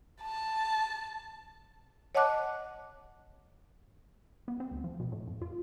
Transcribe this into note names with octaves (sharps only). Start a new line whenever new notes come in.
A5
C#5 D#5 F#5 A5 D6 F#6
B3
C4
D2
F3
B2
A2
F2
F4